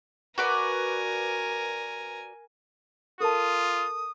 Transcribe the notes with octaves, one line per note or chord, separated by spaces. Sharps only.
F#4 A#4 B4 D5 G#5
F4 A4 A#4 A5 D#6